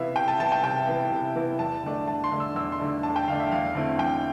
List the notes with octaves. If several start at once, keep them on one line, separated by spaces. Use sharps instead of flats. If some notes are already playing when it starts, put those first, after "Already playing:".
Already playing: C3 E3 B3 E4 E5 F5
C3 G5
A5
E3 B3 E4 A5
G5
C3 G5
E3 B3 E4
C3
E3 B3 E4
E2 A5
D3 A3 D4
E2 A5
C6
D3 A3 D4
E6
E2 E6
C6
D3 A3 D4
E2 A5
G5
D3 A3 D4 F5
E5
E2 F5
D3 A3 C4 E4
E2 G5